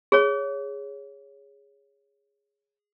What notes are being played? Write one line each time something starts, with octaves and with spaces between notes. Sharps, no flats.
G#4 C#5